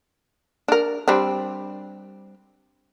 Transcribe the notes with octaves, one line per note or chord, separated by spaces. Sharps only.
D4 A#4
G3 C4 D4